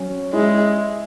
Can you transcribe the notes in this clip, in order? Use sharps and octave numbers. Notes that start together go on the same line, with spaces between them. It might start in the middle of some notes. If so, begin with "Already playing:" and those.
Already playing: F#3 C#4
G#3 E4